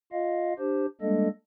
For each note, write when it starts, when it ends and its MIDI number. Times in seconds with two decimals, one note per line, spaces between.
0.12 0.53 65
0.12 0.53 75
0.12 0.53 77
0.59 0.86 62
0.59 0.86 67
0.59 0.86 72
1.01 1.28 55
1.01 1.28 56
1.01 1.28 58
1.01 1.28 62
1.01 1.28 69
1.01 1.28 75